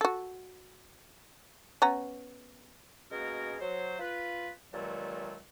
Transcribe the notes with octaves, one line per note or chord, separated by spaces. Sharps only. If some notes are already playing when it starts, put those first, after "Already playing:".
F#4 A4
B3 C#4 A#5
B2 G#3 A#3 C#4 F#4 A#4
F#3 C5
F4 B4
G2 A#2 D#3 F#3 G#3 A3